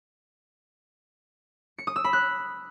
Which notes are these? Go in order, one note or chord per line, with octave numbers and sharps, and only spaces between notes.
C#7
D#6
E6
B5
F#6